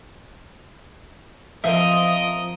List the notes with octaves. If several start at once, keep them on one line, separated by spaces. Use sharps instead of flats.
F3 C4 A#4 D#5 E5 D#6